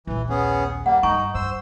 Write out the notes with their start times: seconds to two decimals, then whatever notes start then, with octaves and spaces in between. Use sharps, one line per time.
0.07 A#1 D#2 E3
0.30 B3 C#4 G#4
0.86 G3 A#3 F#5
1.03 G2 D#4 G#5 A#5 C#6
1.35 G2 C5 E6